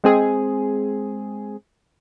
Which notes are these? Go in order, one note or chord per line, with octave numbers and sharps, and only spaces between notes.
G#3 C4 G#4